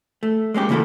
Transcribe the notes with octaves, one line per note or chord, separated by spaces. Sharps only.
A3
G#3 A#3 C#4 G4
C#3 E3 A#3 E4 F#4 A4